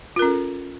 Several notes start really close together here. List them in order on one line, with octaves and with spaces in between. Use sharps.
F4 A#4 C#4 A4